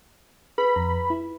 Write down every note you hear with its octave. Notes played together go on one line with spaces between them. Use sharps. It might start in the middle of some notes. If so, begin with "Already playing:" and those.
G#4 B4 B5
F2 A#5
E4